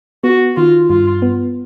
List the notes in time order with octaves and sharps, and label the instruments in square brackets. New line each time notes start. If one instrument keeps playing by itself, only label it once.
[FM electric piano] B3 [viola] F#4
[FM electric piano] D#3 [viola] F4
[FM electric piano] G2 [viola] F4
[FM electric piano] B3